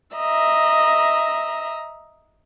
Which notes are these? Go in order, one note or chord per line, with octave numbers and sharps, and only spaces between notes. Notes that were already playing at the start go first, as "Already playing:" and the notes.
D#5 E5 A#5